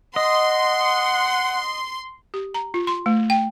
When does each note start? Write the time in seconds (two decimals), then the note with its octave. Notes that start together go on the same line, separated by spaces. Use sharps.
0.16 D#5 F#5 C6
2.34 G4
2.54 A#5
2.74 F4
2.87 C6
3.06 A3
3.30 G5